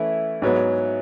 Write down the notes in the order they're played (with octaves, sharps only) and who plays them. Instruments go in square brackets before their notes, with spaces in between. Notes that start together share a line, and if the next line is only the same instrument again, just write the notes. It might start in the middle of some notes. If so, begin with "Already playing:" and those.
Already playing: [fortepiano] E3 A3 C#4 E4
G#2 F#3 B3